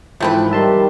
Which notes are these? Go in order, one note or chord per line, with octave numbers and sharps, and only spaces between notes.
G#2 E3 F3 A3 C4 B4
D#3 G3 E5 A5 C6